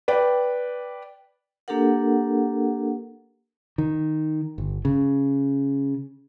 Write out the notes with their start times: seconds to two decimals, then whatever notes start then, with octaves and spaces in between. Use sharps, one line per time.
0.08 B4 D5 G5
1.68 A#3 D4 G4 A4 A#4 F#5
3.78 D#3
4.58 G1
4.85 C#3